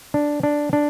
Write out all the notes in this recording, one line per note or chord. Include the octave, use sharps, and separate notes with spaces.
D4
D4
D4